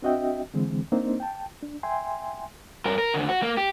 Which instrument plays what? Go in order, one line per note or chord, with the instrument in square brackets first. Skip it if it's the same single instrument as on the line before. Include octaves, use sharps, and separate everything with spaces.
[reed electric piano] C4 D4 F#4 D#5 E5 G5
D3 E3 G#3 C4
A#3 C4 D4 D#4 C5
G5 A5
D4
E5 G5 G#5 C6
[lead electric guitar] G2 A#4
A#4
D#2 D3
F#4
A#3
G4